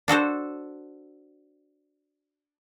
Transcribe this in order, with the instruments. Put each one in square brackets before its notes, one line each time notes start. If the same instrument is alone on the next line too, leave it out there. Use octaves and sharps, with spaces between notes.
[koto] D4 F#4 A4 C5